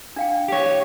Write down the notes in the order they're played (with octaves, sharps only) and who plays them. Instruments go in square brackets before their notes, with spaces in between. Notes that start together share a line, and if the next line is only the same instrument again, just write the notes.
[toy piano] D4 F5 G5
[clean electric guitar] G4 C#5